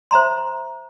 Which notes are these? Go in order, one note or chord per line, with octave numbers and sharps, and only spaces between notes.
C5 E5 A#5 C6